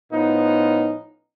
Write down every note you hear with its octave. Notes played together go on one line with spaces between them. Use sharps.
A2 F3 B3 C#4 D#4